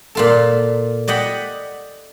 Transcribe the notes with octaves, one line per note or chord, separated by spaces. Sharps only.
A#2 F4 A4
D5 D#5 F#5 G5 B5